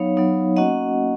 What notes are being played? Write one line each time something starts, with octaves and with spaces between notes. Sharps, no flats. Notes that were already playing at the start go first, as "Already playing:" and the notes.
Already playing: F#3 B3 D#4 C#5 F5
F#3 B3 D#4
A#3 C#4 F#4 D#5 F#5